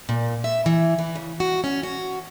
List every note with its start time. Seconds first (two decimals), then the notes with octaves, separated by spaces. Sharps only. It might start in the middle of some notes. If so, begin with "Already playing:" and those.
0.09 A#2
0.44 E5
0.66 E3
0.99 E3
1.15 C#3
1.40 F#4
1.64 C#4
1.83 F#4